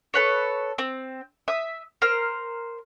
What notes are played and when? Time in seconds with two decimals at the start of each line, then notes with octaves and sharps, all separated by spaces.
0.14 A4 B4 C#5
0.78 C4
1.48 E5 D#6
2.02 A#4 C5 F6